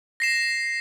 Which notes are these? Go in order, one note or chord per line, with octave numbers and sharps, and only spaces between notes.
A#6 C7 E7